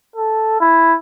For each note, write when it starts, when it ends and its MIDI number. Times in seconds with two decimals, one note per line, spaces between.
0.16 0.57 69
0.60 0.95 64